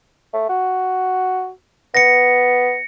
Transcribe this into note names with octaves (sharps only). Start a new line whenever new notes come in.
A3
F#4
B3 A#6 C#7